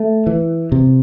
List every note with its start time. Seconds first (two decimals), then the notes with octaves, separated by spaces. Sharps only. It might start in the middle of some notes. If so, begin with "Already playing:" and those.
Already playing: A3
0.27 E3
0.72 C3